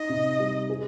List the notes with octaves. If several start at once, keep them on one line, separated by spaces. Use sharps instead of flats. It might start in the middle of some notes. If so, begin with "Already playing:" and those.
Already playing: D#4 D#5
C3
G3
G#4